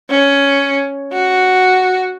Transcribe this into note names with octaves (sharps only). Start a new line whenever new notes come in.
C#4
F#4